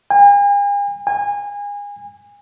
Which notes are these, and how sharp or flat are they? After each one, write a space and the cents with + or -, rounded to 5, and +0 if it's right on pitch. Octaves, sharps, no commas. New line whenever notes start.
G#5 -45
G#5 -30